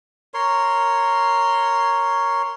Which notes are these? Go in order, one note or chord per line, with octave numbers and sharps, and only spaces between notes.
A#4 C#5 C6